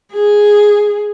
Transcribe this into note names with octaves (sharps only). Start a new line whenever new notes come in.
G#4